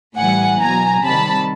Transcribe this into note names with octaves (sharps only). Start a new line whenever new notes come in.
A2 E3 G3 F#5 G#5
B2 F#3 G#5 A#5
C3 D#3 G3 A5 B5